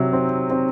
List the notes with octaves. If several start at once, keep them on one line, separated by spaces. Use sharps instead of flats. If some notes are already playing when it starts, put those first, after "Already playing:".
Already playing: C3 F#3
C4
C4